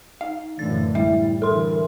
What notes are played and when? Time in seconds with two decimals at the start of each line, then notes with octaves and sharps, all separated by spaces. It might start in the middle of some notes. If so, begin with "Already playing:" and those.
0.21 D#4 F5
0.59 F#2 A2 D3 E3 A6
0.95 A1 G3 E4 E5
1.42 D3 E3 A4 A#4 C6